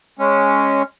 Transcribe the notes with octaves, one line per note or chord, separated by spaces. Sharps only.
G#3 C#4